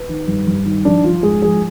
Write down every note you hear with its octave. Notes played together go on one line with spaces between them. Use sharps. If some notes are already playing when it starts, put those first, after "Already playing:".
Already playing: B4
D#3
G2
G2
D#3
F3 D4
F3 F4
G#2 G#4
F3 G#4